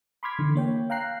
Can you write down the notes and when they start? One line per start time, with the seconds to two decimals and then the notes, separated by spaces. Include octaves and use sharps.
0.23 B5 C6 D6 F6 G#6 B6
0.39 D3 E3
0.55 A#3 C#5 G5
0.90 F5 G5 A#5 F#6 C7